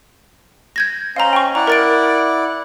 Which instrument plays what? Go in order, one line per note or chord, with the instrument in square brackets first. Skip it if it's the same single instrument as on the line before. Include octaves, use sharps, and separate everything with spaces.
[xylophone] G6 G#6 A#6
[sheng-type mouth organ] C#4 C5 D#5 [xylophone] F5 A#5
[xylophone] G5 C#6
[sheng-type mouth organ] E4 D5 F#5 [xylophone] A#5
[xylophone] A#4 A6 D7